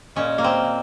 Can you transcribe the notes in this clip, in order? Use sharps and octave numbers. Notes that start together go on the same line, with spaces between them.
A#2 G#3 C#4
A#3
C4